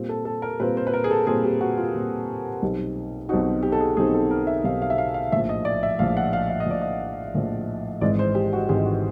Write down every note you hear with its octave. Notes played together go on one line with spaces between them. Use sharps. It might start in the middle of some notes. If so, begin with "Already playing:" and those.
Already playing: A#2 G3 C4 F4
A4
A4
A#4
A#2 G3 C4 F4 B4
C5
B4
A#4
G#4
A4
A#2 G3 C4 F4 G#4
G4
F#4
F4
A#2 G3 C4 F4
B1 B2 G3 C4 D#4
B1 B2 G3 C4 D#4 F#4
G4
A4
G#4
B1 B2 G3 C4 D#4 G#4
A4
A#4
E5
B1 B2 G3 C4 D#4 F5
F5
E5
F5
F5
A#1 A2 F3 E5
D#5
D5
E5
A#1 A2 F3 F5
F#5
F5
E5
D#5
A#1 A2 F3 D5
D#5
A#1 A2 F3
G#1 G#2 E3 G#3 D5
C5
G4
F#4
G#1 G#2 E3 G#3 G4
F#4